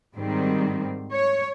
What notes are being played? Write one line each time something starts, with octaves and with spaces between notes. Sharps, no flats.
G#2 D#3 G3 C4
C#5